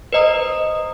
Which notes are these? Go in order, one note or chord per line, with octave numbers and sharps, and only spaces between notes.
B4 C5 D#5 A#5 D#6